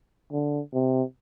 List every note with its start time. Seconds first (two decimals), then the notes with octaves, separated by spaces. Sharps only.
0.32 D3
0.74 C3